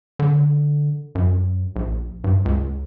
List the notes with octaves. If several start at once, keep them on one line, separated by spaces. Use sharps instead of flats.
D3
F#2
A#1
G2
C#2